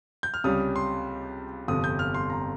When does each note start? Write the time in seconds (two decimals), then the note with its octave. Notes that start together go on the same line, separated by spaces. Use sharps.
0.23 G6
0.34 F6
0.44 C#2 C3 G3 C#4 D#6
0.76 C6
1.68 G1 F2 C3 D#6
1.84 G6
1.99 F6
2.14 C6
2.30 A#5